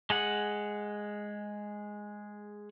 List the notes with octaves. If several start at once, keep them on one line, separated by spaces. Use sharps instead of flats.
G#3 G#4 F#5